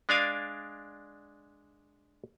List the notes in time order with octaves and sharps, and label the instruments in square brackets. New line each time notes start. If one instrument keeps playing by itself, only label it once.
[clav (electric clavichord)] G#3 D4 D5 F5 G#5